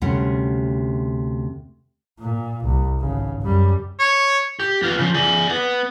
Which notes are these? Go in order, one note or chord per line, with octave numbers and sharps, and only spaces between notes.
D2 C3 G3 C#4 F#5
A#2
C2
G#1 C#3
F#2 G3
C#5
G4
B3 F4
C#3 F3
G#4 D5
B3